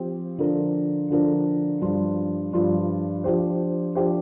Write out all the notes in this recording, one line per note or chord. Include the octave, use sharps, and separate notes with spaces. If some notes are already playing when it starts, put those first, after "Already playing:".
Already playing: F3 C4 G4
D3 F3 D4 A#4
D3 F3 D4 A#4
G2 F3 D4 F4
G2 F3 D4 F4
F3 D4 G4 C5
F3 D4 G4 C5